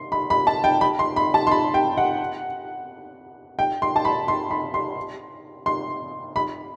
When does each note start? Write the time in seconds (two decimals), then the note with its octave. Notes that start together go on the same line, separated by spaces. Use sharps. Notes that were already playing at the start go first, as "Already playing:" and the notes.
Already playing: C6
0.12 B5
0.30 B5
0.47 A5
0.64 G5
0.81 B5
0.99 C6
1.16 B5
1.34 A5
1.47 C6
1.51 B5
1.74 G5
1.97 F#5
3.59 G5
3.82 C6
3.96 A5
4.05 B5
4.28 C6
4.51 B5
4.74 C6
5.66 C6
6.36 B5